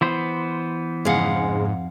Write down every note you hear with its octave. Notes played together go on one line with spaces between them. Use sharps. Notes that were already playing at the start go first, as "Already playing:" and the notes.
E3 B3 C5
F2 G#2 C#3 G#3 F5 F#5